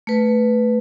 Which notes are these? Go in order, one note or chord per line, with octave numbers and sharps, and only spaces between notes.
A3 B4